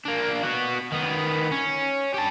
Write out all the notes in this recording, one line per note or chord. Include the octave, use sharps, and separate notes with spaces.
A#3 D4
B3 F#4
D#3 B3
C#4
G4 A5